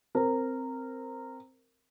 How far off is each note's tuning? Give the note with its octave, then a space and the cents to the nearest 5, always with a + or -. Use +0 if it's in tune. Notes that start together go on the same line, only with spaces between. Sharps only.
C4 +0 A#4 -15